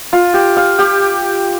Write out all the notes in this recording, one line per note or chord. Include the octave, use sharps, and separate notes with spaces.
F4
G4
F5
G4